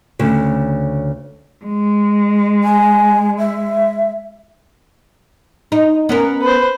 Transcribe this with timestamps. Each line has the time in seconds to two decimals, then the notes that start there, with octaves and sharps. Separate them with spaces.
0.19 D2 C#3
1.64 G#3
2.64 G#5
3.39 E5
5.72 D#4
6.09 B3 C#4 A#4
6.41 B4 C5